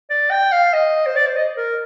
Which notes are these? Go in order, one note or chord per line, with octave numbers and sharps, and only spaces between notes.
D5
G5
F5
D#5
C5
D5
C5
D#5
A#4